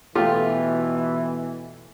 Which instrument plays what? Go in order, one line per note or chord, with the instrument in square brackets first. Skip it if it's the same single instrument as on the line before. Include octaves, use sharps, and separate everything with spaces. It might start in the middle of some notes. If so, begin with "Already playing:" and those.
[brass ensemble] B2 E3 [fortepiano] A3 F4 G4